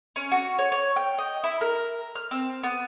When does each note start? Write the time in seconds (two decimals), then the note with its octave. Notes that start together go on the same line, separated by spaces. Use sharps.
0.16 C#4
0.32 F#4
0.58 C#5
0.72 C#5
0.96 G5
1.18 D#5
1.44 E4
1.61 A#4
2.15 F6
2.31 C4
2.63 B3